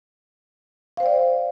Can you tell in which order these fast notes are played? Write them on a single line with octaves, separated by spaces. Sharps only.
F5 C5 G5 D5